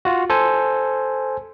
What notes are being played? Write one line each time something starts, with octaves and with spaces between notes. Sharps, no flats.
F4 F#4
A4 C5 G#5